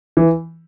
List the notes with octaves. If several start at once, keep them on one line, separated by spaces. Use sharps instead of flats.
E3